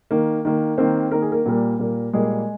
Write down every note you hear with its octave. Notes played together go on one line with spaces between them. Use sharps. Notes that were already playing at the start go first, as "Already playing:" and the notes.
D#3 A#3
D#3 A#3
D#3 A#3 C4 C5
D#3 A#3 A#4
G#4
A#3 A#4
A#2 G3 A#3
A#2 G3 A#3
A#2 G3 G#3 A#3 G#4